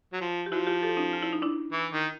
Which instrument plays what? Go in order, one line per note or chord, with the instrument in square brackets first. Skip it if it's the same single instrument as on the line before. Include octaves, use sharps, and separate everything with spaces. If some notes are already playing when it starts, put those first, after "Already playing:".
[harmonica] F#3
F3
[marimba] G4
[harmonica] F3 [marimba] E4 F#4
[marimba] F4 G4
G4 A4
C#4 D#4
F4
E4
D#4
D4 E4
[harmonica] E3
D#3